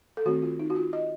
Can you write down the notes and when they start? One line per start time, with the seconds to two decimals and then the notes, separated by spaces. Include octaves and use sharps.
0.17 A4
0.26 D#3 A3 C4 F#4
0.42 F4
0.59 D#4
0.70 F#4
0.76 F4
0.93 D#5